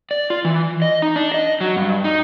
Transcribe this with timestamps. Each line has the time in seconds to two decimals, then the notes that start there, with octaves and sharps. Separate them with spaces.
0.11 D5
0.30 F4
0.45 E3
0.82 D#5
1.02 D#4
1.16 D4
1.34 D#5
1.61 F#3
1.77 G2
2.04 D#4